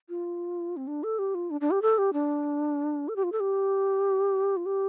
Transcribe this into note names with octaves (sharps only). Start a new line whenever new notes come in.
F4
C4
D4
A4
G4
F4
D4
D4
G4
A4
G4
D4
A4
G4
F4
A4
G4
F4
G4